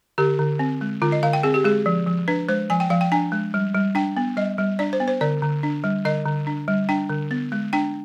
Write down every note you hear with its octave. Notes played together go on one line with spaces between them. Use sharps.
D3 G4
D3
C4
G#3
D3 F4
D#5
D3 F5
G5
C4 G#4
G4
G#3 G#4
F3
F3
D4 B4
G#3 C5
F3 G#5
G5
F3 F5
G5
D4 G#5
G#3
G3
G3
D4 G5
B3
G3 D#5
G3
D4 D5
C5
B3
C5
D3 D5
D3
D4
G3
D3 D#5
D3
D4
G3
D4 G5
D3
B3
G#3
D4 G5